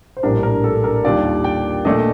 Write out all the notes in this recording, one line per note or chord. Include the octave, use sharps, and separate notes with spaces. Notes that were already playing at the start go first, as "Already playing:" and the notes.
C5
A#1 A2 G3 D4 A#4
A#4
A4
A#4
D#2 D#3 G3 D4 F4 D5
F5
G5
A#2 A3 D4 D#5